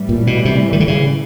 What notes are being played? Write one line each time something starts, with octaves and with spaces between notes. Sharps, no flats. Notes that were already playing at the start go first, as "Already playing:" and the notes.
Already playing: A2 E3 G3
A#2
B2
C3
D#3
D3
C#3